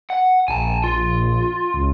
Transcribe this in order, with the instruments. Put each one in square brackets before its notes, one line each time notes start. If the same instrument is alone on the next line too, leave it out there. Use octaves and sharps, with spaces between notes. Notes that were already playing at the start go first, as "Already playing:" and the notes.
[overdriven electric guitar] F#5
[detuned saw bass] A#1 [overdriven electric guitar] G#5 A5
[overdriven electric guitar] F4
[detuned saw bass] C#2